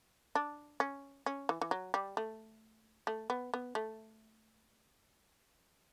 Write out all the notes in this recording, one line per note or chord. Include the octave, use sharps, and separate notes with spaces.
D4
C#4
C#4
E3
E3
F#3
G3
A3
A3
B3
B3
A3